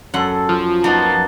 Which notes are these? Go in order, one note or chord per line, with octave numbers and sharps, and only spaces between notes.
F#2 A4 F#5 C6
F3
A#3 B3 D#4 F#5 A5